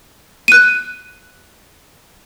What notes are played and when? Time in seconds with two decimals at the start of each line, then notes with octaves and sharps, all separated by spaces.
0.48 F#6 D#7